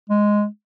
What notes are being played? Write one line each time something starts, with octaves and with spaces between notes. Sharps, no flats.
G#3